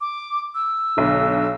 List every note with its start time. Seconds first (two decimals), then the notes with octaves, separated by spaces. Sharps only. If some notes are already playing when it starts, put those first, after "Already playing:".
0.01 D6
0.55 E6
0.97 B1 D3